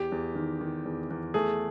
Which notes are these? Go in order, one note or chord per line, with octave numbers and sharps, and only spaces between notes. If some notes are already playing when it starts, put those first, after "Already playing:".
Already playing: E2 G4
E2
D#3
D#3
E2
E2
A3 G#4